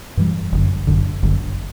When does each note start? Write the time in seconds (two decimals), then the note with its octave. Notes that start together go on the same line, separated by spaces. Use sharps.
0.17 G2 E3 G3
0.52 G1 F#2 D3
0.87 G1 F#2 D3
1.23 G1 F#2 D3